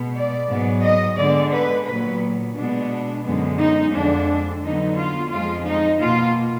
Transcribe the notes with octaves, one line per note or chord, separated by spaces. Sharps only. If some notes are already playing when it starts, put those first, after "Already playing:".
Already playing: B2 G#3 B3
D5
G#2 F#3 B3
D#5
D3 G#3 B3 D5
B4
A#2 F#3 B3 B4
B2 G#3 B3 D4
F#2 D3 G#3 B3
D#4
F2 D3 G#3 D4
D3 F#3 B3 D#4
F4
F2 F3 G#3 F4
D#4
B2 A#3 F4